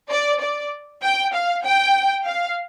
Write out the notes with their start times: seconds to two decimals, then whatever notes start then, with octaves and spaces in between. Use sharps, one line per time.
0.11 D5
0.42 D5
1.03 G5
1.34 F5
1.64 G5
2.26 F5